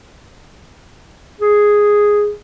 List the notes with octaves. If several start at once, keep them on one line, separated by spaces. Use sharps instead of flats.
G#4